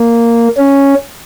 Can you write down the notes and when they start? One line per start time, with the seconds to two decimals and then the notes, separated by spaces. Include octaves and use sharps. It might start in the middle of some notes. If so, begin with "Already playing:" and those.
Already playing: A#3
0.57 C#4